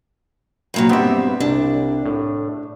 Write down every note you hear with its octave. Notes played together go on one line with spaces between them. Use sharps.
G2 A#2 F#3
G2 B3 C4 G4 E5
C2 D4
A2